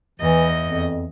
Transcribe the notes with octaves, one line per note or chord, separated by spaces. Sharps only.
E2 E3 D#5
F2